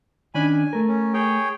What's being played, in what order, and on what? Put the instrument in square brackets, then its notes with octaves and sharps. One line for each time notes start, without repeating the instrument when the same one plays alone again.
[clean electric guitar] D#3 C#4 D4 [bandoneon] G#5 B5
[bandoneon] G#5
[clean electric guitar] A3 A#4
[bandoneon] C#4
G#4 C#5 G5